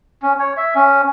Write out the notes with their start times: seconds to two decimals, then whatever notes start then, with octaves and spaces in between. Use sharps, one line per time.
0.22 C#4
0.40 C#5
0.57 E5
0.75 C#4